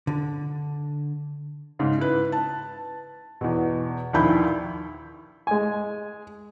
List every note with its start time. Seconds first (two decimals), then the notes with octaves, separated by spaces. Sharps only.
0.07 D3
1.79 G#2 C#3
1.98 E4 B4
2.32 A5
3.41 E2 B2
4.13 A#1 D#2 E4 B5 G6
5.47 G#3 G#5